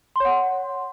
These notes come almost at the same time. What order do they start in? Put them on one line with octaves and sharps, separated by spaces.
C6 C#5 F#5